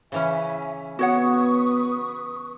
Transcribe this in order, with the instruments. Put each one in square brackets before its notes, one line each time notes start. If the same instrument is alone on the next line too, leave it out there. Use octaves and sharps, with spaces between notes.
[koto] C#3 E3 C#4 [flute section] E5 G#5
[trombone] B3 [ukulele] F#4 C#5 F#5 [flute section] B4 C#6 D#6